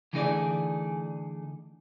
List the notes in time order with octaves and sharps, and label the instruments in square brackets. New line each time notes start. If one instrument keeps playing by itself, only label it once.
[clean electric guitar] D3 E3 A3 D#4 G#4 D5